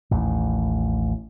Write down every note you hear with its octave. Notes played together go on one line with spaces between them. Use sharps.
A1 D#2